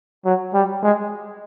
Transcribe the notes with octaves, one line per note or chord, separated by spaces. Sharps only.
F#3
G3
G#3